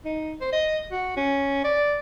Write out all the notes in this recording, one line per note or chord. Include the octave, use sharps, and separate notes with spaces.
D#4
C5
D#5
F#4
C#4
D5